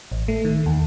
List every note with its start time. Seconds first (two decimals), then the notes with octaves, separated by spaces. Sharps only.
0.12 A1
0.28 A3
0.45 D#3
0.66 D#2